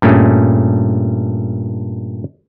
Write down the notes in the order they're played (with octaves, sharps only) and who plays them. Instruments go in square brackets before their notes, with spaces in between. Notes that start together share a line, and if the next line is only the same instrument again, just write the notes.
[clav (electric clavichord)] G2 A#2 A3 C#4 G#4